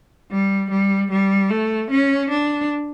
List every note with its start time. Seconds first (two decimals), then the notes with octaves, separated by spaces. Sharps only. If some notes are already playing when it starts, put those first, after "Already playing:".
0.31 G3
0.70 G3
1.11 G3
1.50 A3
1.91 C#4
2.30 D4